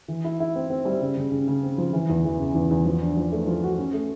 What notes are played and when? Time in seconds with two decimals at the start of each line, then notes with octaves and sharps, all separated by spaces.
0.08 E3
0.24 E4
0.40 E4
0.56 C4
0.70 C4
0.85 G3
1.02 C#3
1.17 C#3
1.32 C#3
1.48 C#3
1.63 C4
1.78 F3
1.93 E3
2.09 E2
2.25 E3
2.39 C#3
2.55 E2
2.71 E2
2.86 F3
3.02 D4
3.17 F3
3.32 A3
3.47 F3
3.64 F#4
3.79 C#4
3.93 A3